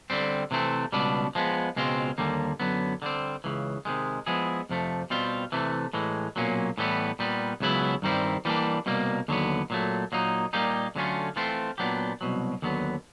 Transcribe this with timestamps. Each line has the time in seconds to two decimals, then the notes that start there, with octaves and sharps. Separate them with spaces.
0.10 D3 G3 C4
0.51 C3 E3 A3 C4
0.92 C#2 B2 G3 B3 D4
1.35 F3 G#3 B3
1.76 C#2 B2 G#3 C4 F4
2.18 D#2 D3 G3 A#3
2.60 F#2 D3 F#3 B3
3.02 D3 G3 C4
3.44 C#2 C#3 E3
3.85 C3 D#3 G#3
4.26 F3 G#3 B3 E4 G#4
4.69 F2 C3 F3 A3
5.10 B2 G3 C4 F4
5.52 C3 E3 A3
5.93 A2 E3 G#3
6.36 B1 A#2 F#3 A#3 C#4
6.78 A2 E3 G3 B3
7.19 A#2 G3 B3
7.60 C#2 C#3 F#3 B3 E4
8.02 G2 D#3 G3 C4 E4
8.45 E3 G3 A#3 D4
8.86 C2 B2 G3 A#3
9.28 D#2 D3 F#3 B3
9.70 A#2 F#3 A3
10.12 A#2 F#3 A#3 D#4
10.53 A#2 G3 A#3 D#4 G4
10.96 D3 F#3 A3 C#4 F4
11.36 E3 A3 C4 F4
11.78 A#2 F#3 B3 D4 G4
12.21 C2 B2 F#3
12.62 D#2 D3 F#3 B3